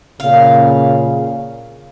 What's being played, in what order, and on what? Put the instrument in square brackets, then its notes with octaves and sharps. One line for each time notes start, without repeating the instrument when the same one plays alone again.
[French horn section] A#2 C#3 [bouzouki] F5